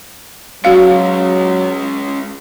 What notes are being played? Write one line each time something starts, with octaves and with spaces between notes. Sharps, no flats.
F#3 G#3 C#4 F#4 F5